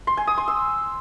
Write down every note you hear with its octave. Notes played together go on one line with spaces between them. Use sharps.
C6
G#5
D#6
C6
E6